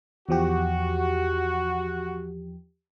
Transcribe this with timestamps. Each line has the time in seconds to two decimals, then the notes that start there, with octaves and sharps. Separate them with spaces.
0.29 E2 F3 F#4 G4